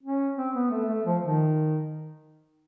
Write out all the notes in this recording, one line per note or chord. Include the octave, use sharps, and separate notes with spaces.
C#4
C4
B3
A3
A3
F3
D#3